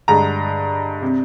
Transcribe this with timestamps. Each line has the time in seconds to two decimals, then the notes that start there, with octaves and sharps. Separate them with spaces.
0.08 G2 D3 G#3 A#5
1.02 C3